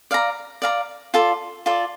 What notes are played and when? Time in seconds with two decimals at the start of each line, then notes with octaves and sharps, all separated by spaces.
0.11 D5 F5 A#5
0.62 D5 F5 A#5
1.14 F4 A4 D5
1.66 F4 A4 D5